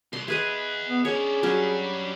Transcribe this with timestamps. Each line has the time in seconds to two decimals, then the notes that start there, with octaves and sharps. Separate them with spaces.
0.13 C2 C6
0.28 G#4 B4 D#5 E5 F#5
0.89 B3
1.05 C#4 D4 G#4 C#5
1.43 F#3 G3 C#4 D4